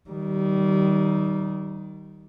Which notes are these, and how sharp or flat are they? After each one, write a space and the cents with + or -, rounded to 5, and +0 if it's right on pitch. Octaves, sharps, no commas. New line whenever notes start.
D#3 +0 G3 -25